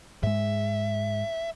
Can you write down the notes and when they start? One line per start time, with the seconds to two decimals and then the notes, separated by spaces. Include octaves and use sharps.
0.23 G#2 G#3 E5